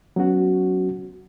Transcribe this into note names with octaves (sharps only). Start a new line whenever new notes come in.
F#3 B3 C#4 F#4